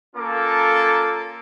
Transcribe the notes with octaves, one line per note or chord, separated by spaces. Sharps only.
A#3 C#4 F4 A4 D6